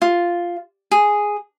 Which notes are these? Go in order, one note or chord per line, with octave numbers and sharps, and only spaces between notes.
F4
G#4